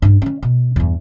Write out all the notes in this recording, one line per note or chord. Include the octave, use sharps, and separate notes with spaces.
G2 D4
D#3 C#4
B2
E2 G2